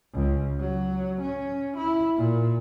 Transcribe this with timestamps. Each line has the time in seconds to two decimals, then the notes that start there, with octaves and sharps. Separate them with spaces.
0.14 C#2
0.60 F#3
1.21 C#4
1.77 E4
2.18 A#2